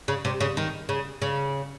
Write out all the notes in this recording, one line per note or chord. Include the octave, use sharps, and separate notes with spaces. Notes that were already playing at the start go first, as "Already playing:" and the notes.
C#3
C3
C#3
D#3
C#3
C#3